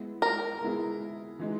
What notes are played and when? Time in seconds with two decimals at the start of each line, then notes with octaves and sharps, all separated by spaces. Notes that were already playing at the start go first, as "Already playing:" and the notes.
Already playing: G#3 B3 E4 G#4
0.22 A#4
0.61 G#3 B3 E4 G#4
1.39 E3 G#3 D#4